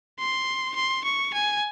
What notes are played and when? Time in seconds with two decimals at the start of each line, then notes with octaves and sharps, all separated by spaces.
0.19 C6
0.76 C6
1.04 C#6
1.34 G#5